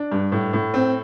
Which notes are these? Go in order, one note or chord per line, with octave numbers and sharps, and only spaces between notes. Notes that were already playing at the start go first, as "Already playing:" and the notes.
Already playing: D4
G2
A2
A2
C4